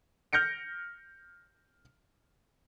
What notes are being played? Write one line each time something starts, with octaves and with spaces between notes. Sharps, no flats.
F6 G6 A#6 C#7 D7